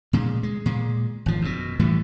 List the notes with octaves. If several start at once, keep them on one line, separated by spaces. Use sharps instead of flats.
A#2 C#3 G#3
G#3
A#2 G#3
G#1 F3
F#2 B2
A2 E3 G3